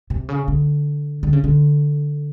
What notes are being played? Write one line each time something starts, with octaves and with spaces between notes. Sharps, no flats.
C3
C#3
D3
D3
C#3
D3